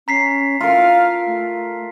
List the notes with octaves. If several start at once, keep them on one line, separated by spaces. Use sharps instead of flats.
C#4 A#5 B6 C7
F4 A4 A#4 F5
A3